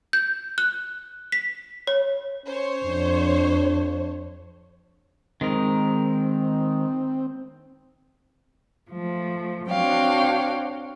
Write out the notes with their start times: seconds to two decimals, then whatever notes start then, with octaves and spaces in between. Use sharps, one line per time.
0.13 G6
0.58 F#6
1.32 B6
1.87 C#5
2.46 C#4 C5 C#5
2.85 F2 D4
5.41 D#3 G#3 C4 A#4
8.91 F3 A3
9.70 C4 D4 F#4 C#5 F5 G5